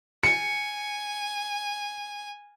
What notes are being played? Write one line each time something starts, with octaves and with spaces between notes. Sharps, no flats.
G#5 C#7